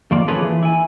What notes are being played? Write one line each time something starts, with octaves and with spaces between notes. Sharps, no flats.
F2 D#3 A#3 F4 D5
A#3 C#4 F4 G#4 A4 B4
E3
E4 G#5